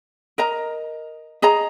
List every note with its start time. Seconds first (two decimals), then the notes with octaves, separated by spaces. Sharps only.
0.38 A#4 D#5 A#5
1.42 G#4 D#5 A#5